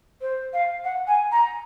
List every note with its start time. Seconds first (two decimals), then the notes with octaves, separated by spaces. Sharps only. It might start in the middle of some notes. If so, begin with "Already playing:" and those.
0.21 C5
0.53 F5
0.84 F#5
1.07 G#5
1.32 A#5